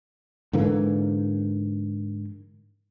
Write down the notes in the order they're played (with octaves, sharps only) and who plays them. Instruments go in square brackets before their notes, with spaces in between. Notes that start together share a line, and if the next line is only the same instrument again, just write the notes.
[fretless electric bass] G#2 D3 E3 A#3